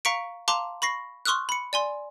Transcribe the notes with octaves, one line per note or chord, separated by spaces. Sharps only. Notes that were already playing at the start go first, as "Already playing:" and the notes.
F5 A#5 C#6 B6 C#7 D7
F5 A5 A#5 C6 D6
B5 C#6 A#6 C7
C6 C#6 D#6 F6 F#6
B5 C#7
D5 G#5 C6